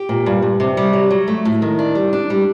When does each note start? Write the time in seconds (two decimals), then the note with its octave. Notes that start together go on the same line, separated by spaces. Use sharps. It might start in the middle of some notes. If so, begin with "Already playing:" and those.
Already playing: G4
0.09 A#2
0.26 G2
0.42 G2
0.60 C3
0.77 G3
0.93 F#3
1.11 F#3
1.28 A3
1.45 A2
1.62 D#3
1.79 D4
1.95 G3
2.13 D4
2.30 G3